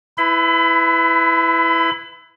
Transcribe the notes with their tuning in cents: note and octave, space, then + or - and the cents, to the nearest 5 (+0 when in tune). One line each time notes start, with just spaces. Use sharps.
E4 +0 B4 +20 B5 +35